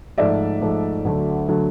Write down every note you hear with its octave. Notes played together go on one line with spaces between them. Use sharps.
G#2 F3 A3 D5 E5
G#2 F3 A3
D2 D3 F#3 A3
D3 F#3 A3